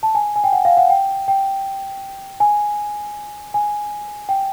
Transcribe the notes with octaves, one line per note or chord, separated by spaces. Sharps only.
A5
G#5
G#5
G5
F#5
F5
F#5
G5
G5
G#5
G#5
G5